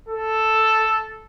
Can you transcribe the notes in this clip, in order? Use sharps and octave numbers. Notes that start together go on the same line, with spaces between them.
A4